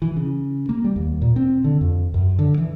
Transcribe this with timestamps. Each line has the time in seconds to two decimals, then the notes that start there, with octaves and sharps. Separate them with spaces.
0.02 E3
0.16 C#3
0.69 A#3
0.84 G3
0.96 D#2
1.21 A#2
1.36 C4
1.64 D3
1.81 F2
2.14 F#2
2.39 D3
2.58 E3